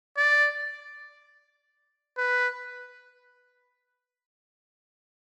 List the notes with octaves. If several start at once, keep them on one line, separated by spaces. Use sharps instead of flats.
D5
B4